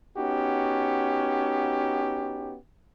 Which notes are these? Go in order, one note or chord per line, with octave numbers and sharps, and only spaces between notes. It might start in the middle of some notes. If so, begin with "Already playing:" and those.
B3 C#4 D#4 F#4 G4